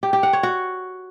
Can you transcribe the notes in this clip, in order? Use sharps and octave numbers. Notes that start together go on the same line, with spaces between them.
G4
G4
F#5
C#5
F#4